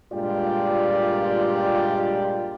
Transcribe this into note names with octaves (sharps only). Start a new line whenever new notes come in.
G2 A#2 G#3 F4 G4 D5